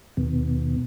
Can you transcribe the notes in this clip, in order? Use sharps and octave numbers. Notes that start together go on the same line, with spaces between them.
D#2 B2